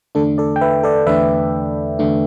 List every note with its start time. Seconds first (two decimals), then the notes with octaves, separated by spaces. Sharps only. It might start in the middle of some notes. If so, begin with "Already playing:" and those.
0.15 E2 D3 A3 D4 A4
0.38 A4 D5
0.56 G5
0.61 B4 E5
0.83 A4 D5
1.07 E2 D3 A3 D4 B4 E5
1.99 E2 D3 A3 D4